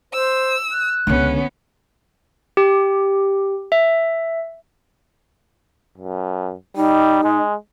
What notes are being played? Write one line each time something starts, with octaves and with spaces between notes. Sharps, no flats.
C5 E6
F#6
C#2 D3 B3 C#4
G4
E5
F#2
G3 D#4
G#3